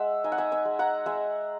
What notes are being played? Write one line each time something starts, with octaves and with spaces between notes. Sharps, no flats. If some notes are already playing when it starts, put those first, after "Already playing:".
Already playing: G#3 E5 F#5
D#4 G#5
F#5
E5 G#5
E5 G#5
G#3
F#5 A#5
G#3 E5 G#5